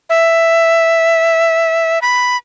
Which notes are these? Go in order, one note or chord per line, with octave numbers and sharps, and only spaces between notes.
E5
B5